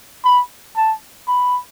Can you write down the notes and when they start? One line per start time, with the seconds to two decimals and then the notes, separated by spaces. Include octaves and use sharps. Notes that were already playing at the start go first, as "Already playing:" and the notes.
0.25 B5
0.77 A5
1.28 B5